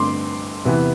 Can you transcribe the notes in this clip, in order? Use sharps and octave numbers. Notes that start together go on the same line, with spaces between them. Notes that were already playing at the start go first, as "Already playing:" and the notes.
Already playing: G2 D3 A3 C4 C6 D6
E2 C3 E3 B3